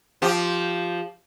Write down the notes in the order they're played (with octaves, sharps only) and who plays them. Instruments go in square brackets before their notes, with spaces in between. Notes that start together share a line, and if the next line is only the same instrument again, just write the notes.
[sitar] F3 G4